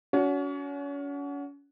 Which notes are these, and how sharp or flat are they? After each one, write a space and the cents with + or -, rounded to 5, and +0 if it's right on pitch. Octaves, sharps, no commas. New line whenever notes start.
C#4 +35 F#4 +0